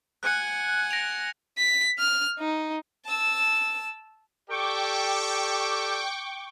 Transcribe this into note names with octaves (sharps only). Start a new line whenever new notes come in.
F#5 G#5 F#6 C#7
A#6 D7 F7
B6
F6
D#4
A5 E6
G4 A4 D5 G5 C#6 D6